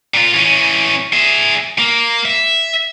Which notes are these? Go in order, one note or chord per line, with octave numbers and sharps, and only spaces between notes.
A#2 F4
E3 C#4
G#4 E5
A#3
E5